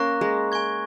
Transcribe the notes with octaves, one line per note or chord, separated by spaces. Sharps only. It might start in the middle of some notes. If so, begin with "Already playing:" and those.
Already playing: A#3 C#4 A#5 C#6 F#6 A#6
G#3
G#5 C#6 G#6